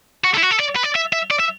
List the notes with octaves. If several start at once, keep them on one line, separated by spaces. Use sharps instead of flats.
F#4
A4
E4
F#4
A4
D5
B4
D5
E5
E5
D5
E5